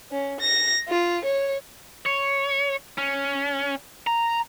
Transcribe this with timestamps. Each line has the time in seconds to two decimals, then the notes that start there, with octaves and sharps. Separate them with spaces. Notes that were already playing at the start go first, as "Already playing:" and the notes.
0.11 C#4
0.40 A#6
0.89 F4
1.25 C#5
2.06 C#5
2.98 C#4
4.07 A#5